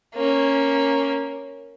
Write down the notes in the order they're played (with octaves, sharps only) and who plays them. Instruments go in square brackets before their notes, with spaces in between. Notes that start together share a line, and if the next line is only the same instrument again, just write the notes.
[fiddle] A#3 C#4